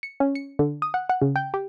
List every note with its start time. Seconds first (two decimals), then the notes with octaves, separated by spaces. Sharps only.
0.03 C#7
0.20 C#4
0.35 C#7
0.59 D3
0.82 D#6
0.94 F#5
1.09 F#5
1.22 C#3
1.36 G5
1.54 G4